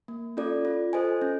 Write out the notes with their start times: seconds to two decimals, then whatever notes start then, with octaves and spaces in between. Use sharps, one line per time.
0.08 A#3
0.37 C#4 F4 A4 D5
0.65 F4
0.93 A4 C5 D#5 G#5
1.21 C#4